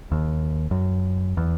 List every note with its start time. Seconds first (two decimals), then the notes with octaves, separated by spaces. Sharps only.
0.12 D#2
0.71 F#2
1.37 E2